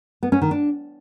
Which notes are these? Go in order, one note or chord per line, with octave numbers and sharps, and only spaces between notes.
B3
C#4
D#3
D4